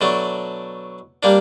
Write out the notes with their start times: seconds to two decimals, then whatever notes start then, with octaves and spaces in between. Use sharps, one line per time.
0.01 B2 F#3 A3 D4
1.23 G3 A#3 D4